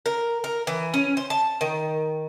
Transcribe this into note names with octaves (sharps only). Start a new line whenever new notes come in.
A#4
A#4
E3
C#4
C5
A5
D#3